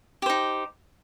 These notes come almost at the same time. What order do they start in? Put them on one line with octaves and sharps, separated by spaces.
G4 C5 D#4